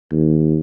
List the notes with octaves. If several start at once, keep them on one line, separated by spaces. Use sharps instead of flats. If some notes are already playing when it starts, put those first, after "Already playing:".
D#2